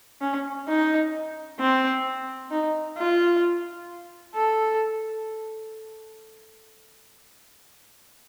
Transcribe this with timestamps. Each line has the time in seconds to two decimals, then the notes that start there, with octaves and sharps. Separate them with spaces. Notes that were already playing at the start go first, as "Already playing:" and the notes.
0.22 C#4
0.68 D#4
1.60 C4
2.51 D#4
2.98 F4
4.35 A4